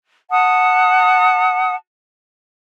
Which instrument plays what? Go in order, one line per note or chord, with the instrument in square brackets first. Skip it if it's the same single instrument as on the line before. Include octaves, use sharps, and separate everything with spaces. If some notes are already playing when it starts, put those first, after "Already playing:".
[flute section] F#5 A5 D#6